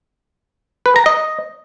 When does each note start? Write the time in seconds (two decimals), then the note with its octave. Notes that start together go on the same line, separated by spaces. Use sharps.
0.86 B4
0.96 A#5
1.06 D#5